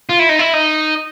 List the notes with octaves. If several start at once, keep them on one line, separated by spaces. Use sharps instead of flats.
F4
E4
D#4
E4
D#4